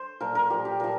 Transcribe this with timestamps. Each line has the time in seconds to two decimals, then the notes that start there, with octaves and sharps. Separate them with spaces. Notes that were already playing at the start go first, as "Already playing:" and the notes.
Already playing: C5
0.20 A#2 F3 A#4
0.35 A#4
0.50 A#2 F3 G4
0.65 G4
0.80 A#2 F3 A#4